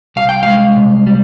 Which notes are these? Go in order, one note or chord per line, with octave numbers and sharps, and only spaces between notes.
C2 F5
G5
G#3 F5
C2
G3